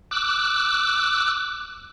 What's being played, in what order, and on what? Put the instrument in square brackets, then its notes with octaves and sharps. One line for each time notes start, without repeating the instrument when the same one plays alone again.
[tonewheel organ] D6 E6 F#6